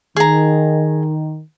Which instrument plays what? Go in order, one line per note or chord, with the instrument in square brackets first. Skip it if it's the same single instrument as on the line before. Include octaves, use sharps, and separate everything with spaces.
[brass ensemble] D#3 [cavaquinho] G#4 A#5